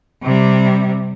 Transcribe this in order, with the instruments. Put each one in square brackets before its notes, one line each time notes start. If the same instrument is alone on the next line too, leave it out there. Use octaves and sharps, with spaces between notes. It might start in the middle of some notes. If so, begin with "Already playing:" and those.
[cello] C3 G3